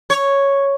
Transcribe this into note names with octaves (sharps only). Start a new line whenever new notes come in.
C#5